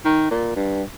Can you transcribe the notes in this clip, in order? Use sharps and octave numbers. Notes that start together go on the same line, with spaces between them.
D#3
A#2
G2